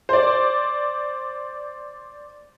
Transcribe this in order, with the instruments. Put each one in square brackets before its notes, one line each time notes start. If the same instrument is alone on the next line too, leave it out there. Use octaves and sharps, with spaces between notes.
[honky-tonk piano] C5 D5